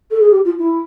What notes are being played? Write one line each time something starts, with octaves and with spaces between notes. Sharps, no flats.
A4
G#4
G4
F4
E4